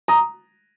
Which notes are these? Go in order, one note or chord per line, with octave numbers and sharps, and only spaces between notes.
A#5 D#6